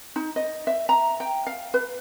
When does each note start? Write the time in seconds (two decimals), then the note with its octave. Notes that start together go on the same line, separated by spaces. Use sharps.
0.16 D#4
0.36 D#5
0.67 E5
0.89 A#5
1.20 G5
1.47 F5
1.74 B4